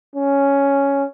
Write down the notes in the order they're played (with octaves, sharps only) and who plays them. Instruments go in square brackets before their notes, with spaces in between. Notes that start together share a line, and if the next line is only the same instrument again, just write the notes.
[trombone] C#4